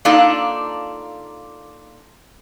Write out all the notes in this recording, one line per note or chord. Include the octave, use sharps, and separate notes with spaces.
A#3 D4 D#4 F4 A4 D5